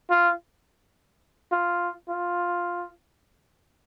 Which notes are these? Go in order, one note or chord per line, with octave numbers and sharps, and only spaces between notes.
F4
F4
F4